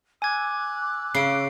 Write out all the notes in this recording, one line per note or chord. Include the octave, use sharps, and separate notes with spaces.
G#5 D6 E6 F#6 G#6
C#3 C7 D7